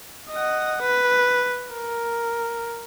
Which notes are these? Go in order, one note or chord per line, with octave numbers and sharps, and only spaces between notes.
D#5 F#5
B4
A#4